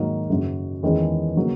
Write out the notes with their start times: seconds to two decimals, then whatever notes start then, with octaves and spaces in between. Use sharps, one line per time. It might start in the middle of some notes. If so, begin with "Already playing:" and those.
Already playing: G#2 D#3 F#3 A#3 D#4
0.30 F#2 C#3 F#3 C#4
0.83 E2 D#3 G#3 C#4
1.36 C#3 F#3 A#3